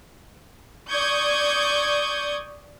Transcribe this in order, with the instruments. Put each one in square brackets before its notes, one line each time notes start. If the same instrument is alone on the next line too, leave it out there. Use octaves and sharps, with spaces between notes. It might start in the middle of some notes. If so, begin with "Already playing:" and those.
[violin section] D5 C#6 D#6 G6 G#6